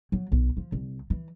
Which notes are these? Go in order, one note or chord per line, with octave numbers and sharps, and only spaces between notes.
F#3
B1
F3
C2
E3